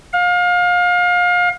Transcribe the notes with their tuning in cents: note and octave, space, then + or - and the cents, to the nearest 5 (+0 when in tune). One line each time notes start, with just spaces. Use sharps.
F5 +30